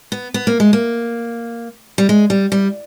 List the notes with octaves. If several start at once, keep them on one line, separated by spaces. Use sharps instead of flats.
B3
B3
A#3
G#3
A#3
G3
G#3
G3
G3